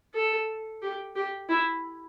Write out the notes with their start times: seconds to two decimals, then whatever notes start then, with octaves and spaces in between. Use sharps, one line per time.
0.14 A4
0.82 G4
1.16 G4
1.49 E4